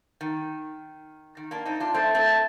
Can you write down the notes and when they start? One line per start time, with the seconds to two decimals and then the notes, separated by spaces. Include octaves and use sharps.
0.21 D#3
1.37 D#3
1.51 A#3 D4
1.66 C4 D#4
1.80 D4 F4
1.94 A3 C4
2.15 A3 C4